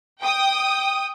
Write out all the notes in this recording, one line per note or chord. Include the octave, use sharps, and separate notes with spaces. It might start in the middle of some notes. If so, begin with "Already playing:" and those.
G5 D#6